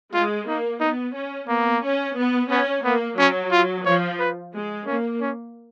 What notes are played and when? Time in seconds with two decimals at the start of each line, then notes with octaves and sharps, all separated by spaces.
0.13 G#3 F4
0.47 A#3 D#4
0.80 B3 D#4
1.14 C#4
1.48 A#3 B3
1.82 C#4
2.16 B3
2.50 B3 C#4
2.84 A#3 B3
3.18 F#3 C#4
3.51 F4
3.85 F3 C#5
4.19 B4
4.53 G#3
4.86 A#3 C#4
5.21 C#4